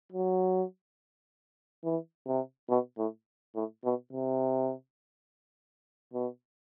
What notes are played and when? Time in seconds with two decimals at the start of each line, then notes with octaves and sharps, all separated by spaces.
0.12 F#3
1.84 E3
2.26 C3
2.69 B2
2.97 A2
3.55 A2
3.84 B2
4.12 C3
6.13 B2